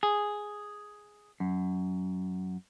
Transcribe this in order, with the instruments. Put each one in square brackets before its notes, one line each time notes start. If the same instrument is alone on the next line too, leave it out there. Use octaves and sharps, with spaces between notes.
[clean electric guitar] G#4
F#2